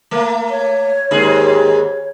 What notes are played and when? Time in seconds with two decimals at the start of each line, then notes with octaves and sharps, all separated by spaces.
0.11 A3 A#3
0.50 C#5
1.11 D#2 G#2 G#4